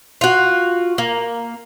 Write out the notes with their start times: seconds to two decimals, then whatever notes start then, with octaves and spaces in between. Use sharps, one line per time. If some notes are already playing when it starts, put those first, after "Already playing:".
0.21 F4 F#4
0.98 A#3